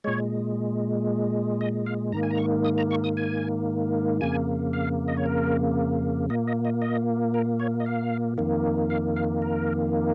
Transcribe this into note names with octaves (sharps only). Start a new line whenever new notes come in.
A#2 G#3 C#5
D#5
F5
G#2 D#3 A#3 A#5
G#5
A#5
C#6
D#6
A#5
C#6
D#6
G#5
F2 C#3 A#3 G#5
F5
D#5
C#5
A#4
A#2 A#3 D#5
D#5
D#5
D#5
A#4
C#5
D#5
F5
F2 D#3 A#3
F5
F5
A#4